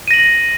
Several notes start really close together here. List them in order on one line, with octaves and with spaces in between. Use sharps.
D#7 A#6 F#7